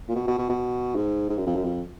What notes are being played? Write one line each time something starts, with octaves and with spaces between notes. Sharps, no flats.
A#2
B2
B2
B2
B2
G#2
G#2
F#2
F2
F#2
F2